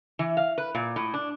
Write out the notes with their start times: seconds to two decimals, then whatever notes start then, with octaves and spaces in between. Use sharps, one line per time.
0.19 E3
0.37 F5
0.58 B4
0.75 A#2
0.96 A2
1.14 D4